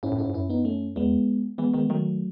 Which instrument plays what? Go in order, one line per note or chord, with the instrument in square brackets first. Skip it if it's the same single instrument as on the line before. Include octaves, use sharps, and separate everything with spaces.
[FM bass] G#2 [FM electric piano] C#4 E4
[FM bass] A2
[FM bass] G#2 [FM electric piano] C#4 E4
[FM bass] G#2
[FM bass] F#2 [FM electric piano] C#4 E4
[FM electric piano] B3 D#4
A3 C#4
[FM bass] E2 [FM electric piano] G#3 B3
[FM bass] E3 [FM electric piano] G#3 B3
[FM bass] D#3 [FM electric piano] G#3 B3
[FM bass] D#3 [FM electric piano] F#3 A3